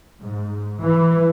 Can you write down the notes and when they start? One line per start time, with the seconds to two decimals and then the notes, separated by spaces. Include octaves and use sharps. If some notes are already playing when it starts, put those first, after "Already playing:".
0.20 G#2
0.83 E3